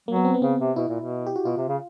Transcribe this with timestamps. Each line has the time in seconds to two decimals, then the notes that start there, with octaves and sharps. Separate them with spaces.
0.08 F#3 A#3
0.16 B3
0.25 C4
0.34 B3
0.42 C#3 C4
0.60 C3
0.76 B2 E4
0.88 A#2
1.00 B2
1.26 G4
1.36 F#4
1.45 B2 F4
1.57 C3
1.68 C#3